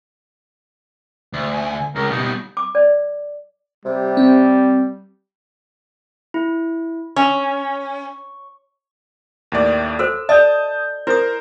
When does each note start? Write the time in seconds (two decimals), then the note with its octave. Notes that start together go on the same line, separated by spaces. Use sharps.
1.33 D2
1.54 G#5
1.96 C#2 A#4
2.11 B2 G3 D#4
2.57 D6
2.75 D5
3.85 C3 G3
4.17 C4
6.34 E4
7.16 C#4 C#6
9.52 D#2 A2 D5
9.99 F#4 A4 C5 E6
10.29 A4 D5 D#5 A5 D#6 G6
11.07 E4 A#4 C5 D#6